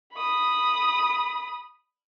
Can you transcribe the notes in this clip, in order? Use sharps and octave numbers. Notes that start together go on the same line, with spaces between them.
B5 D#6